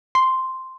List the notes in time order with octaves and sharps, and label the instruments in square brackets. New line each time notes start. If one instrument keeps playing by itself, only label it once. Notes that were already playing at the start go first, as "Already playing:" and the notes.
[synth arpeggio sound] C6